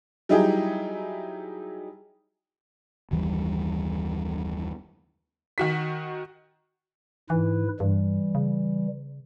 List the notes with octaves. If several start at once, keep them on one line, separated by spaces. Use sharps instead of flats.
F#3 G3 D#4 E4 G4 G#4
F#1 D#2 E3 G3
D#3 F#4 B6
G#2 E3 E4 B4
G2 E3 G3
C#3